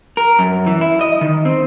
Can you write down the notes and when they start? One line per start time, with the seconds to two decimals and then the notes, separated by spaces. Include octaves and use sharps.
0.17 A#4
0.39 F#2
0.66 E3
0.81 E4
1.01 D#5
1.21 D#3
1.45 C4